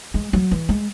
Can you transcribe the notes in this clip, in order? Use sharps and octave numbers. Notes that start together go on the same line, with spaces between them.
G#3
F#3
E3
G#3